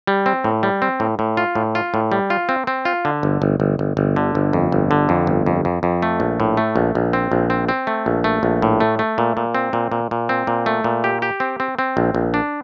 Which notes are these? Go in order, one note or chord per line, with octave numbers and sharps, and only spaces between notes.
G3
C4
A2
G3
C4
A2
A2
F4
A2
F4
A2
G3
F4
C4
C4
F4
D3
G1
G1
G1
G1
G1
D3
G1
F2
G1
D3
F2
G1
F2
F2
F2
A3
A#1
A2
A3
A#1
A#1
C4
A#1
C4
C4
A3
A#1
A3
A#1
A2
A3
A3
A#2
A#2
C4
A#2
A#2
A#2
C4
A#2
A3
A#2
G4
G4
C4
C4
C4
A#1
A#1
D4